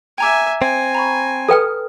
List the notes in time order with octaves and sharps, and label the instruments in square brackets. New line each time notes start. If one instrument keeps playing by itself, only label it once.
[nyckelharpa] E5 G#5 [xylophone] G5 A#5 D6
[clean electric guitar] C4 [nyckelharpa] G#5
[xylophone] A#5 B5 C#6
[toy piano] A4 B4 G5 [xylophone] D#6 F6